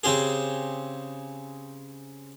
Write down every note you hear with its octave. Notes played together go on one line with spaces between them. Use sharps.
C#3 C4 G4 G#4